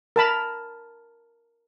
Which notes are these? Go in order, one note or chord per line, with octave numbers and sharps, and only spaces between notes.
A#4 A5 B5